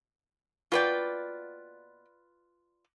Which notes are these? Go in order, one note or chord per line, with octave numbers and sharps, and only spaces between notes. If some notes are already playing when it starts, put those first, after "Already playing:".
B2 A#3 F4 B4 D5 G5